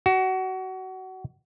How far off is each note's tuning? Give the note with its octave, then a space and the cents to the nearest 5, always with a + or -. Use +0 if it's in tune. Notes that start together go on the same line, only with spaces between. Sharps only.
F#4 +25